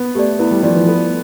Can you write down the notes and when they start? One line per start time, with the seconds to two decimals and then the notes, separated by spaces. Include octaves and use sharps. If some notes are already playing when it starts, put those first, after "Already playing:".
Already playing: B3
0.15 A3 G4 D5
0.39 B3 E4
0.51 G3
0.63 F3 G4 D5
0.75 E3
0.87 B3 A4